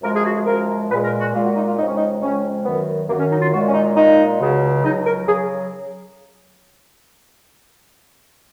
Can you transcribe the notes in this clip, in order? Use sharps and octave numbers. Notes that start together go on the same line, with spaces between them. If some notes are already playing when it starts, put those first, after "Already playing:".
F#2 F3 G#3 A#4
G#4
F#4
G#4
F#2 F3 G#3 A#4
A#2 G#3 B4
A#4
F#4
A#2 G#3 F4
F#4
D#4
F4
F2 C#3 G#3 D#4
C#4
D#4
F2 C#3 G#3 C#4
F#2 D#3 F#3 B3
F#2 D#3 F#3 A#3
C#4
D#4
F4
A#2 G#3 F#4
C#4
D#4
A#2 G#3 D#4
C#2 C#3 F#3
C#2 C#3 F#3 D#4
A#4
C#3 F#3 G#4